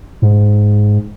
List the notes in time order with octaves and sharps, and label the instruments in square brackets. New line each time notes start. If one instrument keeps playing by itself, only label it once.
[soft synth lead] G#2